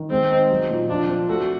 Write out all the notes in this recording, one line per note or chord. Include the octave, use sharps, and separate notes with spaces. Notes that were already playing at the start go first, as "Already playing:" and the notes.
Already playing: D#3
G#3 C4
D#4
F#3
A#2
F3 D4
C4
A3 F#4